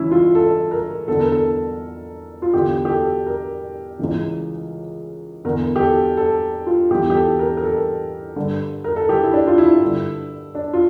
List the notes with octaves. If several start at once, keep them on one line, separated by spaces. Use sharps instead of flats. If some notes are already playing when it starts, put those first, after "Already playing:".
Already playing: C#2 C#3 E3 C#4 E4
F4
A4
A#4
E2 D3 A4
A#4
A4
F4
E2 D3 G4
G4
A4
A#4
C#2 C#3 E3
E2 D3 A#4
G4
A4
A4
F4
E2 E3 G4
G4
A4
A#4
A#4
A4
G2 D3
A#4
A4
G4
E4
D4
F4
E4
G2 D3
D4
F4